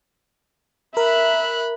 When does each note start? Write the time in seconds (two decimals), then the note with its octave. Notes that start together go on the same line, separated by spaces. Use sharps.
0.97 A#4 E5 B5 F#6